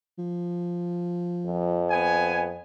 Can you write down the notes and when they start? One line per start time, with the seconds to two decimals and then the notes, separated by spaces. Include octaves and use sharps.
0.19 F3
1.46 F2
1.90 B3 G#5